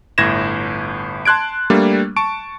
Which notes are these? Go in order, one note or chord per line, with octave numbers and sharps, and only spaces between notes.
G1 A2 G#6 A#6 E7
A5 C6 F#6 G#6 D7
G3 A3 A#3 D4
A5 C#6 D7